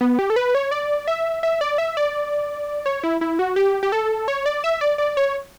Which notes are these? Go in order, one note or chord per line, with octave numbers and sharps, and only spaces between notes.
B3
G4
A4
B4
C#5
D5
E5
E5
D5
E5
D5
C#5
E4
E4
F#4
G4
G4
A4
C#5
D5
E5
D5
D5
C#5